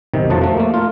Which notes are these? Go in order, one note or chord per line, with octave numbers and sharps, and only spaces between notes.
B1 C3 D#3
F2 F3 F#3 A3 F#5 A5
F3 A3
A3 A#3
F4